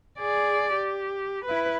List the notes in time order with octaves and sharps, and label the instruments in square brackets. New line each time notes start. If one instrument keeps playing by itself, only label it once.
[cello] G#4 D5
G4
E4 B4